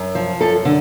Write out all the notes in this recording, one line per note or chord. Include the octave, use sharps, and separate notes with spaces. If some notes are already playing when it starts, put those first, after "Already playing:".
Already playing: F#2
F3
F#2 A4
D3